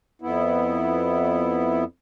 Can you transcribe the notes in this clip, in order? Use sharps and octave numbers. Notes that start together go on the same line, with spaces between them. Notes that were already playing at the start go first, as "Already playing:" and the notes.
F2 B3 E4